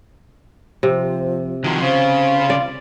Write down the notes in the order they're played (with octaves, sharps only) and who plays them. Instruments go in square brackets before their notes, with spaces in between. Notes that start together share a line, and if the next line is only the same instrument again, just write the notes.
[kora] C3 [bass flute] F3
[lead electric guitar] D#3 F3 [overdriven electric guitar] F#3
[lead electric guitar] C#3 [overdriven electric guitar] F4 [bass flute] C5
[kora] D5